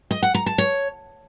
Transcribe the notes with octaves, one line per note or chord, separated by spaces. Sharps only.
D#5
F#5
A#5
A5
C#5